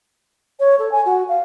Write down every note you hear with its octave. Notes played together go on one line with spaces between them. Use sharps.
C#5
A4
G#5
F#4
F5